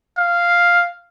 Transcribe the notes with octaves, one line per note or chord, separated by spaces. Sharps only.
F5